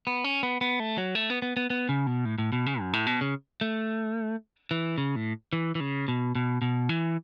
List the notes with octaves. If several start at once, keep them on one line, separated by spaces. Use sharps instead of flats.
B3
C#4
B3
B3
A3
F#3
A3
B3
B3
B3
B3
C#3
B2
A2
A2
B2
C#3
F#2
A2
B2
C#3
A3
E3
C#3
A2
E3
E3
C#3
B2
B2
B2
E3